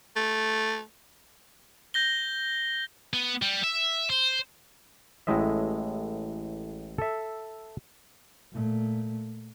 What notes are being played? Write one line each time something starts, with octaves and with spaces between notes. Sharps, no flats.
A3
G6 A#6 G7
B3
G3
E5
C5
A1 A2 G#3 D#5 E5
A4 E5
A#2 A3